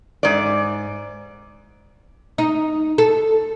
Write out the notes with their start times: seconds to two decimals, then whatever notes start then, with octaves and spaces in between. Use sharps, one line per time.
0.23 G#2 D5
2.38 D#4
2.98 A4